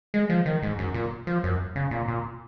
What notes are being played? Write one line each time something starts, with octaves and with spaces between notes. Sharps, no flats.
G#3
F3
D#3
G#2
F#2
A#2
F3
F#2
C#3
A#2
A#2